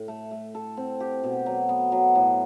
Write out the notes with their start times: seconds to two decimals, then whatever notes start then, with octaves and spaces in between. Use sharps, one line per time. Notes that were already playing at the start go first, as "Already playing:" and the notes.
Already playing: A2
0.08 A3
0.31 A3
0.55 A4
0.77 C4
1.00 G4
1.23 B2
1.46 F#3
1.69 B3
1.92 F#3
2.15 A2